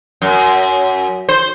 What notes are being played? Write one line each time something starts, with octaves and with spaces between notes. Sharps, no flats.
F#2
C5